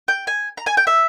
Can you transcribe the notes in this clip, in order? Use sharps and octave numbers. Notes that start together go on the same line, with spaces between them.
G5
G#5
A#5
G#5
G5
E5